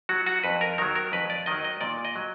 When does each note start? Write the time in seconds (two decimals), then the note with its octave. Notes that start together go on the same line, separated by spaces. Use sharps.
0.09 F#3 F#4
0.26 F#4
0.43 F2 B4
0.61 A#4
0.78 D#3 F#3 A#4
0.95 A#4
1.12 F2 B4
1.30 D5
1.46 D#3 F#3 D#5
1.64 D#5
1.81 A#2 D5
2.05 D#5
2.16 F#3